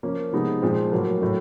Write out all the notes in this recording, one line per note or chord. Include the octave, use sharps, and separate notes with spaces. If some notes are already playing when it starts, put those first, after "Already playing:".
F3 A#3 C#4
C3 F3 G#3 B3 D#4
A#2 F3 G#3 C4
A2 F#3 A#3
A2 F#3 A3